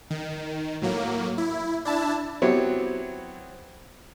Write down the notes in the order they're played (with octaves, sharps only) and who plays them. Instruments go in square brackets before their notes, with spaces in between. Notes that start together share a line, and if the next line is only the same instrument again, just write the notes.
[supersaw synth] D#3
A2 F#3 A#3
E4
D4 E4 A5
[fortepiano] F#3 B3 C4 E4 G4 C#5